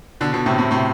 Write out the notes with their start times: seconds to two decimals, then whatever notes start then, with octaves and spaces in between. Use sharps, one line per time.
0.20 B2 D3
0.33 B2 D3
0.46 A2 C3
0.58 A2 C3
0.71 A2 C3